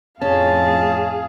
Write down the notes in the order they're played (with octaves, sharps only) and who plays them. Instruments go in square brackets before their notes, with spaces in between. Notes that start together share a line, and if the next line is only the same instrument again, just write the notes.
[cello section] F2 A2 A3 [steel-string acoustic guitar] C#4 [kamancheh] G#4 F5 [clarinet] A5